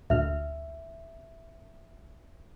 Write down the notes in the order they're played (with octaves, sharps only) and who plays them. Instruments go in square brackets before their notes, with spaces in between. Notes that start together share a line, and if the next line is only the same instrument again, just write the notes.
[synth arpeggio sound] D2 A#2 F6 [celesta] E5